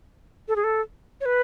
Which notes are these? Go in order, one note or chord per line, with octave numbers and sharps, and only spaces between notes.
A4
G#4
A4
C#5
B4